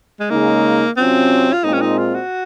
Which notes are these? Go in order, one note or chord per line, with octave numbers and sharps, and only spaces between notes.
G#3
C#3 G#3 A#3 D#4
C3 F#3 C4 C#4 F4
F4
A#2 G#3 C4 D#4
C#4
D#4
F4
F#4